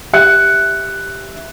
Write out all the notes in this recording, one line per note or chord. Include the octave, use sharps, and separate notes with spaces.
G4 E5 F#6 C#7